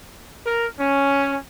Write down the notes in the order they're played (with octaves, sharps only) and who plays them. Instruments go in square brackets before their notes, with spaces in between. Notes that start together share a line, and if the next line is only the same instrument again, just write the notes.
[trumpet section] A#4
C#4